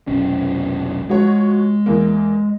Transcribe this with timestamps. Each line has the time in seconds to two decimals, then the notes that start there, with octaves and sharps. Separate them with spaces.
0.07 F1 B1 C#4
1.09 F3 G#3 F#4 C#5
1.86 E2 A#3